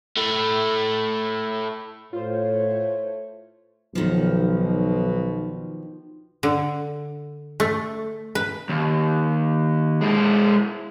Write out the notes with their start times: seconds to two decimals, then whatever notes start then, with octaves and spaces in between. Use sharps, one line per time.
0.17 A3 E4
2.13 A2 A3 F4 C5 C#5
3.95 B1 B2 D#3 F3
6.43 D3
7.60 A3
8.35 B4
8.69 D#2
10.01 G#3 E4